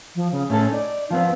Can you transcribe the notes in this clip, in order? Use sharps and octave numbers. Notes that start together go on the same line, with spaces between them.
F3
C#3
A2 C#4 A4 C#5
D#4 D5
F3 B3 C4 F5